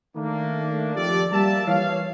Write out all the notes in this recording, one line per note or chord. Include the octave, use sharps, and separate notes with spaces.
D#3 A3 A#3 D4
F2 G4 A4 D5
G3 A#3 E5 A5
E3 C#5 F5